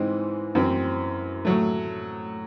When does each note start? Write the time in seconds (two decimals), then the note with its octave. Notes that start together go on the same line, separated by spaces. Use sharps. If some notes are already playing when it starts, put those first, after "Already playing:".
Already playing: G#2 E3 C4 D#4
0.55 F#2 E3 C4
1.45 A2 F#3 A3